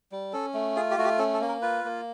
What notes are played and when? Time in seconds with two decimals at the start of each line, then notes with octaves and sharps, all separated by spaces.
0.12 G3
0.33 C#4 A4
0.54 A3
0.76 F4 G#4
0.91 G4
0.98 A3 F#4
1.04 G4
1.19 C#4 A4
1.34 A4
1.41 A#3
1.49 A#4
1.62 F4 B4
1.84 A#3